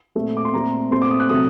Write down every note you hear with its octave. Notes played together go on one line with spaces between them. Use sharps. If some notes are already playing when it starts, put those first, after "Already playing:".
A#2 A3 C4
D6
C6
A#2 A3 C4 A#5
A#2 A3 C4 C6
D6
D#6
F#6
C3 F#3 A3 D#6